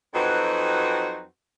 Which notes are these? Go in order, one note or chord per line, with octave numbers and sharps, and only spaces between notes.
F2 F#3 C4 D#4 F#4 B4